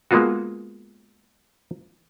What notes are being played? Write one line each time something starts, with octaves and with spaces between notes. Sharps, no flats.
G#3 A#3 B3 F4 F#4